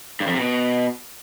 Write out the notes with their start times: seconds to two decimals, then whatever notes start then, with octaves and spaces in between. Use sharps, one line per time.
0.20 G2
0.27 F2
0.34 C3
0.40 B2